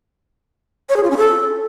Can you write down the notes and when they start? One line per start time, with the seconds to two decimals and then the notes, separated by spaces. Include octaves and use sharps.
0.89 C#5
0.96 G#4
1.03 F4
1.10 C#4
1.17 A4